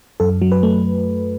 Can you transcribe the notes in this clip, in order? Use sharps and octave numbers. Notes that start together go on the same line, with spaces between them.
F#2 A4
F#3
B4
A3